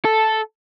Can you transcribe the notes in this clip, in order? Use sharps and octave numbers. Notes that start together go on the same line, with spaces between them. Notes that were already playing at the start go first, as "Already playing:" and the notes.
A4